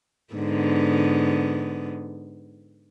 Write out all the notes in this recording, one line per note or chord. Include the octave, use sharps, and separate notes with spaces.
G#2 D3 B3